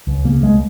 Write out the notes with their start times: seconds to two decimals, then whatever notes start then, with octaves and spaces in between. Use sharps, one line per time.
0.07 C#2
0.25 C#3 A#3
0.43 C#2 G#3